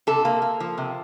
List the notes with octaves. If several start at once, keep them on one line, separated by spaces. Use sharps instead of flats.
C3 A4
A#3
A#3
F3
C3